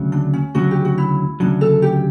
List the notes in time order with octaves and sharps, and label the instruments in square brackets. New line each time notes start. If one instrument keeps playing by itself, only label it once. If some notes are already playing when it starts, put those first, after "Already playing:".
Already playing: [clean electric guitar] D2 C#3 F#3
[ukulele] D4
C#4
[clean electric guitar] D2 C#3 F#3 [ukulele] F#4
[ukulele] G4
F#4
E4
[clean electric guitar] D2 C#3 F#3 [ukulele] D4
[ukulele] A4
G4